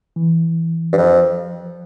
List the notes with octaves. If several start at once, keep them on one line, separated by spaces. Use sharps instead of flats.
E3
G2
F2 F3